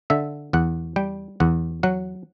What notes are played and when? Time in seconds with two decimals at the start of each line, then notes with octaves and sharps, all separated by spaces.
0.10 D3 E5
0.53 E2 F#5
0.96 G3 G5
1.40 E2 F#5
1.83 F#3 F#5